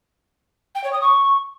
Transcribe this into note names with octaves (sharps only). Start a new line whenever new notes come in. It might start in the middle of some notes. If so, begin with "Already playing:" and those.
G5
C#5
D#6
C#6